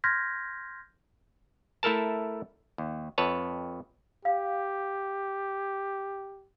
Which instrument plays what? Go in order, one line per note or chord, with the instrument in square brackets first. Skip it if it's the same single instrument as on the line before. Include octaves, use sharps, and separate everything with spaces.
[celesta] C6 F6 G6 G#6 A#6 B6
[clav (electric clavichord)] A3 E4 A4 A#4 A5
D#2
F2 B4 C#5 A5
[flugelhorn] G4 [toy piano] F5